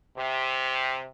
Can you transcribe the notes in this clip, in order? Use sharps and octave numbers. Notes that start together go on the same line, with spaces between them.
C3